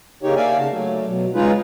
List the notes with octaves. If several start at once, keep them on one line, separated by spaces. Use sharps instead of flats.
C#3 A#3 D#4 G4 C#5
A#3 D5 E5 F5 G#5
C#3 F#4 A5
F#3 A3
B2 F#3
C#3 G#3 D#4 F4 G#4 B4